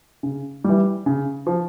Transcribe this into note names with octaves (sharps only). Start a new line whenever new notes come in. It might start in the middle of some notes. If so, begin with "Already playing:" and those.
C#3
E3 G3
C#3
F3